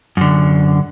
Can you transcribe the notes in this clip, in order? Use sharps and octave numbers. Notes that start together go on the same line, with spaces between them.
F#2 D3